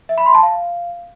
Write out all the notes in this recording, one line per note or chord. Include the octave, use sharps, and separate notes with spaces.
E5
B5
C6
A5
F5